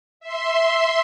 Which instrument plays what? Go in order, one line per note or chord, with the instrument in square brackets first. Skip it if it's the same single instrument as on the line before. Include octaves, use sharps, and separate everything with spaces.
[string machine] E5 C6